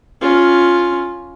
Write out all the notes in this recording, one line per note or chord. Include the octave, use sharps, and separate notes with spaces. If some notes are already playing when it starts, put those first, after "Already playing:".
C#4 F4